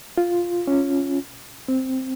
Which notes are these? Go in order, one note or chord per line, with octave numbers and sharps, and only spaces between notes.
F4
C#4
C4